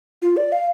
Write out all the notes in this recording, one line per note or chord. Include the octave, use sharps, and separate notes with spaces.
F4
D5
F5